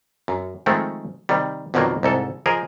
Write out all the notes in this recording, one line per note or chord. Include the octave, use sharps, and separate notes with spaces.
F#2
D#3 F3 G#3 A3 C4
C3 D#3 G3
F2 B2 D3 D#3 F#3 A#3
C2 G#2 A4
F3 G#4 A#4 D#5